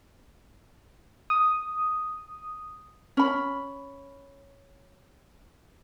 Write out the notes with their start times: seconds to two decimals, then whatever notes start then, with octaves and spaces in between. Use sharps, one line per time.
1.30 D#6
3.17 C#4 B5